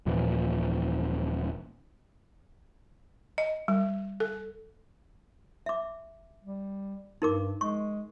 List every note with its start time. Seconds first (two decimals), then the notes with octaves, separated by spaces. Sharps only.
0.06 D#1 A#2 E3 F3
3.38 D#5
3.68 G3
4.20 A4
5.66 E5 D6
6.43 G3
7.22 G2 D#4 A#4 D6
7.61 G#3 C#6